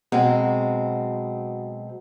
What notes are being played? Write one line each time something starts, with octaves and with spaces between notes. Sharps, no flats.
B2 F#3 G#3 C4